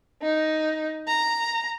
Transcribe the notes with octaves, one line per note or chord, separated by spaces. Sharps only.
D#4
A#5